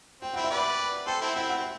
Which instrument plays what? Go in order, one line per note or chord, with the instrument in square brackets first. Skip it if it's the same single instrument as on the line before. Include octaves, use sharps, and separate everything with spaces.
[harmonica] C4 [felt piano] G5
[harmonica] C4 E4 [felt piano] F#5
[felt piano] E5
[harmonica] B4 D5 [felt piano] F#5
[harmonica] A4 C5 [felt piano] G5
[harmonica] C4 E4
[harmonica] C4 E4 [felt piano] F#5
[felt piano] F#5
[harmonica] C4